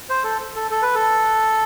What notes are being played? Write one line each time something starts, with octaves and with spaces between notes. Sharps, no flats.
C5
A4
A4
A4
B4
A4